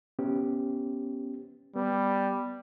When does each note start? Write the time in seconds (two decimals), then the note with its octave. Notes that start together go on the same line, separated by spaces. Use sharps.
0.19 B3 C#4 G4
1.76 G3 B3